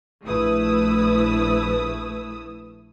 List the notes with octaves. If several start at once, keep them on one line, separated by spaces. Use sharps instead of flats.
A#1 A3 E4 B4 D#6 E6